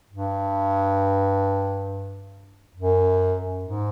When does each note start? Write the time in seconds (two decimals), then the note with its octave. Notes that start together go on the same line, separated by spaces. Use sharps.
0.10 G2
2.76 F#2
3.65 G#2